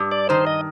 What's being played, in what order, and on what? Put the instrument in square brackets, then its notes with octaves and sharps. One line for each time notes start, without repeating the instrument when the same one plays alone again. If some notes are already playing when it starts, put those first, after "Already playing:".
Already playing: [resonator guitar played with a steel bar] G2 G3
[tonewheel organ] D5
[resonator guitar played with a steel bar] D#3 [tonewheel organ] C5
[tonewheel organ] D#5